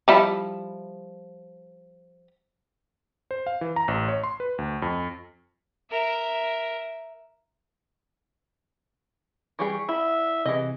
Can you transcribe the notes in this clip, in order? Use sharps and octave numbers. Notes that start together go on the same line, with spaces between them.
F3 G3 E4
C5
F5
E3
A#5
A1
C#5
C6
B4
D2
F2
A#4 E5
E3 G3 G#4 C#6
E4 E5 B5
C3 E3 G#4 D#5